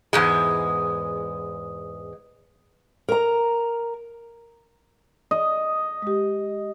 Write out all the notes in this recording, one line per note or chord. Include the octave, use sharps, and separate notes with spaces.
E2 G#2 G#3
A#4 A#5
D#5
G#3 G4